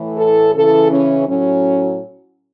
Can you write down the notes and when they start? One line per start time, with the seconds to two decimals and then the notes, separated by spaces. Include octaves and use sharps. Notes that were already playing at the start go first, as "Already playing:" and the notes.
Already playing: A2 E3
0.18 A4
0.55 C#3 E3 A4
0.91 C#4
1.28 A2 F#3 C#4